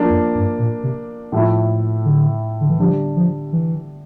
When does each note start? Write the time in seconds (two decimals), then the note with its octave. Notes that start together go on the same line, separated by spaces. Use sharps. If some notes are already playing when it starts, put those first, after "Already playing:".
Already playing: F3 A#3 D4
0.10 F2
0.35 G2
0.59 A#2
0.83 C3
1.32 A2 F3 A3 E4
2.05 D3
2.61 D3
2.69 E3
2.79 D3 F3 G3 D4 G4
3.16 F3
3.53 E3